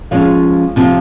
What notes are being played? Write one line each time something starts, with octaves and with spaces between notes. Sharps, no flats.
F3 G#3 C#4 F4 C#5 F5
C3 F3 C4 F4